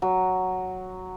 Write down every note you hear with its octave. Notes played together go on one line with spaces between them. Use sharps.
F#3